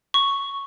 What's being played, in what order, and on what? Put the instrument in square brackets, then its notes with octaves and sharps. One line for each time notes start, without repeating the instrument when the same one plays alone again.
[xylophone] C#6